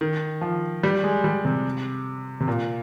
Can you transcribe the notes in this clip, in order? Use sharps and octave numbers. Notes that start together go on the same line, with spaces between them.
D#3
F3
G3
G#3
G3
C3
C3
A#2